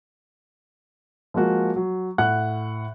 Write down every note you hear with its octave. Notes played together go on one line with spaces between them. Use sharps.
F3 G#3 A#3 F#4
F#3
A2 F#5 F#6